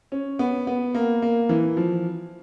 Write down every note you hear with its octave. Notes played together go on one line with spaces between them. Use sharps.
C#4
B3
B3
A#3
A#3
E3
F3